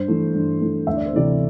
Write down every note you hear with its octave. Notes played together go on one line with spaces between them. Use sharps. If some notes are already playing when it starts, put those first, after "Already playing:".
Already playing: G2 C5
E3 A3
G2
E3 A3
D2 E5
D5
C5
C3 E3 A3 D5